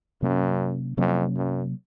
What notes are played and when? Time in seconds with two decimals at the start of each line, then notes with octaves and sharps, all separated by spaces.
0.22 F#2 C3 F#3 A#3 C#4
0.97 F2 C3 F#3 A#3 C#4
1.36 F#2